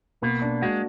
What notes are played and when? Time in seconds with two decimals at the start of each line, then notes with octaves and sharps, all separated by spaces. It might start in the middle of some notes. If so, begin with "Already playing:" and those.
0.22 B2 A#3
0.42 D4
0.62 G#3 F#4